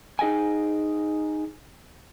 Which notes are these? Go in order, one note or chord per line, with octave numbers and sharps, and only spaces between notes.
D#4 G#4 D#5 G5 G#5